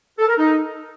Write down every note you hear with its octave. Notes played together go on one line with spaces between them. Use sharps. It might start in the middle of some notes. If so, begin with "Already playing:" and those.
A4
A#4
D#4